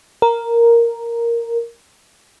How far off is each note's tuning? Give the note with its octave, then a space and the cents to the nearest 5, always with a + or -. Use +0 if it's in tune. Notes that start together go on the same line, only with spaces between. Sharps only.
A#4 +0